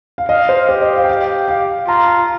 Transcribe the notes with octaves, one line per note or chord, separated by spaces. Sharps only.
F5
D#5 F5
C5
G4 C5
D#5
F5
G5
F5
F5
F4 A#5
A#5